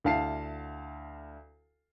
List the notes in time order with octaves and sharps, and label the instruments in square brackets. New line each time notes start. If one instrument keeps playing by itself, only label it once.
[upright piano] D2 E4 F5 A5 C7